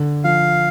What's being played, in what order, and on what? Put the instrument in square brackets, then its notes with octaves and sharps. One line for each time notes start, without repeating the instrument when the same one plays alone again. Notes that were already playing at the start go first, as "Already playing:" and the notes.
Already playing: [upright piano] D3
[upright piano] F3 [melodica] F5